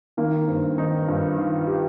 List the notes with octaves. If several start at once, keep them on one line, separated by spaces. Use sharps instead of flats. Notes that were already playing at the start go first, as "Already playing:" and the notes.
D#3 A#3
G2 C4
D#3 D#4
G2 F4
D#3 F4
G4